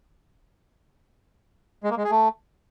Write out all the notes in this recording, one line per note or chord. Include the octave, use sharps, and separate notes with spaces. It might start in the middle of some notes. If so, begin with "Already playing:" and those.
G#3
A#3
G#3
G#4
A3